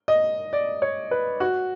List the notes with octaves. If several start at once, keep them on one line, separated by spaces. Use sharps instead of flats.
D#5
D5
C#5
B4
F#4